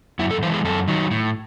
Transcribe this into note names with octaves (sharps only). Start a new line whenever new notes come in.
F#2 E4
A4
E3 G#3 C5
G#4
F#2 A4
D#3 F#3
A2